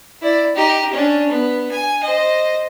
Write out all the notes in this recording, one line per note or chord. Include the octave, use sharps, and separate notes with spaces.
E4 D5
D#4 G4
C#4 D4
B3
G#5
C5 D#5